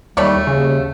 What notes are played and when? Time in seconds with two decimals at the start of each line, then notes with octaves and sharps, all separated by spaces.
0.17 D#2 G3 A3 C#5 D5
0.47 D#2 C#3